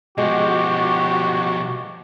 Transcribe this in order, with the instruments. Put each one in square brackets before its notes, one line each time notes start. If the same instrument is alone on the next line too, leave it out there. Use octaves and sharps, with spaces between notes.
[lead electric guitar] B2 F3 [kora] G#3 [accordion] F#4 [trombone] G4